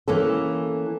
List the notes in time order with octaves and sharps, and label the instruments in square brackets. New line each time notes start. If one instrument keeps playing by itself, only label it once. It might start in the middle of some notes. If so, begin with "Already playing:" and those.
[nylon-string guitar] E3 A#3 C#4 A4